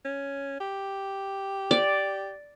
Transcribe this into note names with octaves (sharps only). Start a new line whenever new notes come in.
C#4
G4
D5